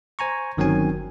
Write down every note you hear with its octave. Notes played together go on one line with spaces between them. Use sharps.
C5 G#5 A#5 C#6
G1 D#3 F#3 C4 C#4 G#5